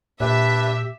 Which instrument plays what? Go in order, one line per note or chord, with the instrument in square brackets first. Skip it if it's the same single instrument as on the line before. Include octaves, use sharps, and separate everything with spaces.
[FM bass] A#2 [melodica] D4 B4 [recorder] G4 [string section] E5